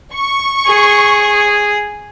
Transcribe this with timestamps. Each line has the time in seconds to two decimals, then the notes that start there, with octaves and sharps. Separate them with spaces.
0.13 C#6
0.67 G#4